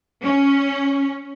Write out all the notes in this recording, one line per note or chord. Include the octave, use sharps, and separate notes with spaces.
C#4